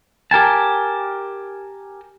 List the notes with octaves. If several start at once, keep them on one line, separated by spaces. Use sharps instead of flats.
G4 A#4 G#5 A5